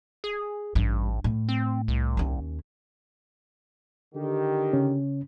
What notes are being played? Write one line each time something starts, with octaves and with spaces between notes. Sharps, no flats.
G#4
A1 G2
A2
C4
C2
D#2 C#4
D3 D#3 G4
C#3 C#4